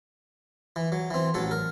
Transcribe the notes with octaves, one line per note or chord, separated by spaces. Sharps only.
E3
F#3
E3 C4
A1 F#3 A4
A#4